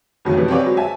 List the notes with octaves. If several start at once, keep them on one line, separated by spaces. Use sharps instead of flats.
F2 D#3 F#3 A3
B2 E3 G3
C4 G4 G#4 B4 C#5 D5
F#3 G#3
E5 G#5 A5